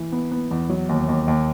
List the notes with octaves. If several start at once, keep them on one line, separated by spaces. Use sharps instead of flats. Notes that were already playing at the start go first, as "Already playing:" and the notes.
Already playing: E3
B3
B3
E2
F#3
D#2
D#2
D#2